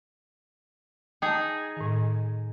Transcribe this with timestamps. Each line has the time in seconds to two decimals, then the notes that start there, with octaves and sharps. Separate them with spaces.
1.22 D#4 G#4 G5 A5
1.77 A2 D#3